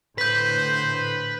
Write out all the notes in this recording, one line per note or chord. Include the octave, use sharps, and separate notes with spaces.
A2 D3 B4 C5 G6 B6